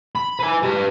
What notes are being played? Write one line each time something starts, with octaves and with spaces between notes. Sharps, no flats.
B5
B4 G#5
G4 B4